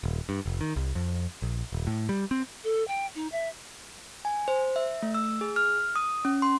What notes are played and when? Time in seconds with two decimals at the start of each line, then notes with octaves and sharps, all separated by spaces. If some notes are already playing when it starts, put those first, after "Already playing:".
0.03 D#1
0.29 G2
0.46 F1
0.61 D#3
0.76 C2
0.95 F2
1.42 A#1
1.72 D#1
1.87 A2
2.09 G3
2.31 C4
2.64 A4
2.88 G5
3.15 D#4
3.32 E5
4.25 G#5
4.48 C5
4.76 E5
5.03 A3
5.14 E6
5.41 G#4
5.56 F6
5.96 D#6
6.25 C#4
6.42 C6